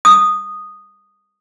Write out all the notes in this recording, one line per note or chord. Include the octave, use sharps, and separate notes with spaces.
D#6